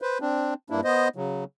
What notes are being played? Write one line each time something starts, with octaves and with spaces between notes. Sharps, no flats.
B4 C5
C4 D4
G2 A#3 D4 E4
B3 C5 D#5
C#3 F#3